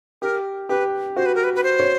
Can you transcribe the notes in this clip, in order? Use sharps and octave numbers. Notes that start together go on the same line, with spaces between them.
G4 A#4
G4 B4
F#4 C5
B4
A#4
B4
B4
C5
C#5